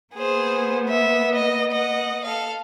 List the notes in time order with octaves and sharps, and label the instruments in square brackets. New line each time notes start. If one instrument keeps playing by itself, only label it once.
[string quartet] A#3 B3 [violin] G#4 C5
[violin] E5
D#5
D#5 F#5
A4 F5